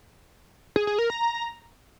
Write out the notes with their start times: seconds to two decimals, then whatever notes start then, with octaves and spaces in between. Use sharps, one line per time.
0.76 G#4
0.87 G#4
0.99 A#4
1.10 A#5